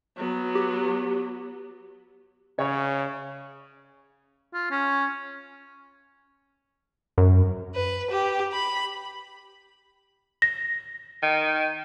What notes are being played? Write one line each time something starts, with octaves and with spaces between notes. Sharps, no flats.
F#3 B3
G4
C#3 C#5
F4
C#4
F#2
B4
G4
B5
A#6
D#3